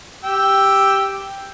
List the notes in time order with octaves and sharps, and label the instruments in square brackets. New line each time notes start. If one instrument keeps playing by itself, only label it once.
[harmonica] G4 G5 E6